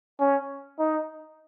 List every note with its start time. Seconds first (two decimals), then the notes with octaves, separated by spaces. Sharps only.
0.20 C#4
0.79 D#4